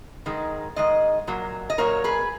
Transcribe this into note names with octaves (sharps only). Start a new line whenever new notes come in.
G#2 D#3 G#3
G#2 D#3 G#3 D#5
A#2 F#3 A#3
D#5
A#2 F#3 A#3 A#4 C#5
G#4 B4